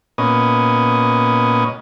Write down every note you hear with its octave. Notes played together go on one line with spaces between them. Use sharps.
A#2 B3 C#4 D#5